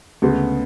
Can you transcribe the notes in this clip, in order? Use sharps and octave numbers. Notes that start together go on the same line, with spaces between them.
D2 C#3 G#3 B3